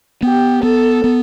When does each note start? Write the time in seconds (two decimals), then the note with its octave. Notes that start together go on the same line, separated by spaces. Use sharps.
0.23 B3 G4
0.63 B3 A4
1.04 B3